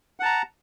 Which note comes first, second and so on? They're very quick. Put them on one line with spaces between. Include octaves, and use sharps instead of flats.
F#5 A5 A#5